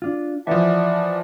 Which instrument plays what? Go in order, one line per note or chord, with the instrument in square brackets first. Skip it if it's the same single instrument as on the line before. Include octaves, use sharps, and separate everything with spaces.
[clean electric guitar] D4 F4
[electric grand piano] E3 F3 [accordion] D5 F#5 A5 [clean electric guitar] E5